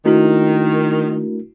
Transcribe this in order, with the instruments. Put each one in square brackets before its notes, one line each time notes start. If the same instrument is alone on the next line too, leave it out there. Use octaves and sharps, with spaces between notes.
[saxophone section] D#3 [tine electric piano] A3 D4 A#4 [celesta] E4 F#4